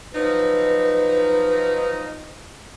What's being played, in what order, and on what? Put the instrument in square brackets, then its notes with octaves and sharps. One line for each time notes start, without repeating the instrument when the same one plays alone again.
[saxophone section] F3 F#3 D#4 [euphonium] B4